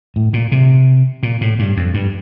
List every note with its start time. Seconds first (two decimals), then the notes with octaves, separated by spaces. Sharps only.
0.16 A2
0.33 A#2
0.52 C3
1.23 A#2
1.41 A2
1.59 G2
1.77 F2
1.94 G2